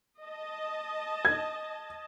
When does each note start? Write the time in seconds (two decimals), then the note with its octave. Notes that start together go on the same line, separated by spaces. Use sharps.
0.24 D#5 A5
1.25 G#6